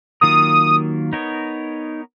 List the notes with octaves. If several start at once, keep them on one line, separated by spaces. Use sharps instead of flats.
D#3 F#3 A#3 F4 A#4 D#6
B3 D#4 A#4 C#5